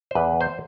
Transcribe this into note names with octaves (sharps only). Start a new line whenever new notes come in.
C5
E2 B4
C5